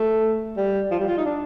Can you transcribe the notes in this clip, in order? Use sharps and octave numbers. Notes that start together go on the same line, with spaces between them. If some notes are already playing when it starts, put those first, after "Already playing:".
Already playing: A3
G3
F3
G3
F4
D#4
D4